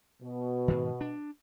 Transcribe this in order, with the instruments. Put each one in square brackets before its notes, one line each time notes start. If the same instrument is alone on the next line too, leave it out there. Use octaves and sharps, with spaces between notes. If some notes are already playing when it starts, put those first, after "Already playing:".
[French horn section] B2
[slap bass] G#2 D#3
D4